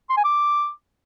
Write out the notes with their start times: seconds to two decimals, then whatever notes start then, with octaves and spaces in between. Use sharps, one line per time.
0.10 C6
0.17 G#5
0.25 D6